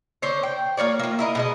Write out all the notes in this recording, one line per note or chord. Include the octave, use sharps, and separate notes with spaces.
D3 C5 C#5
G5
A#3 F4 C#5 D5
A#3 F4
E4 A#4 D#5
B2 G#3 D#5